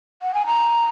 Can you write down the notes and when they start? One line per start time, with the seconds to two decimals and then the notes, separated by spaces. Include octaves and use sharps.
0.22 F#5
0.34 G#5
0.47 A#5